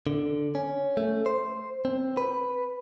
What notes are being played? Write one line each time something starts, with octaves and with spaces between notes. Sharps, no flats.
D3
C#4
A3
C5
C4
B4